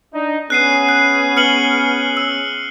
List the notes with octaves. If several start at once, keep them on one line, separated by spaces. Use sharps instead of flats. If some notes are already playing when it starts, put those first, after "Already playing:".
D4 D#4
B3 C#4 G#4 F#6 C7 D#7
F#6
F6 C#7 F#7
E6